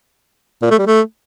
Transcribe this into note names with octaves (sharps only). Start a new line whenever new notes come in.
A#2
A3
G3
A3